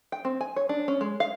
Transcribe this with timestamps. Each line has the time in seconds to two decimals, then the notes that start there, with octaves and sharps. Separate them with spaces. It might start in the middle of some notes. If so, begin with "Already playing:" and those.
0.12 G5
0.25 C4
0.41 G#5
0.56 C#5
0.69 D4
0.88 C#4
1.01 G#3
1.20 F5